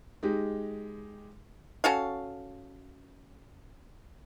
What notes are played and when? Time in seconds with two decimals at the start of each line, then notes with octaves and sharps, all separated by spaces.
0.23 G#3 D#4 G4
1.84 C#4 F#4 A4 F5